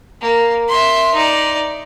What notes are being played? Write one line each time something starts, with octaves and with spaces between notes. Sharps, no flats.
A#3
E5 C6
D#4 D5